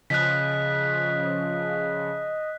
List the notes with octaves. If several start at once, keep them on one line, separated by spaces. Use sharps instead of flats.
C#3 F3 D#5 F#6 B6